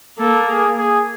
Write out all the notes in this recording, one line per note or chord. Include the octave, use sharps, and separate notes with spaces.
A#3 A4
G#4
G#4